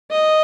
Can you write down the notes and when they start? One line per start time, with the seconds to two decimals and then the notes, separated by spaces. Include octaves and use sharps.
0.11 D#5